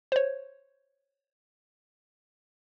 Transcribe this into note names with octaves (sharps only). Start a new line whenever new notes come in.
C5 C#5